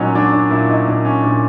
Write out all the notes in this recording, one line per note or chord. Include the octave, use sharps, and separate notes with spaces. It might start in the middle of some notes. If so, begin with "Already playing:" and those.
Already playing: A#2 F#3 C#4 D#4
F#3 D4
D4
A#2 E4
D#4
A#2 D4
C#4
A#2 D4